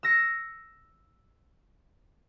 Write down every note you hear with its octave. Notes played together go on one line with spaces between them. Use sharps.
E6 A#6 C#7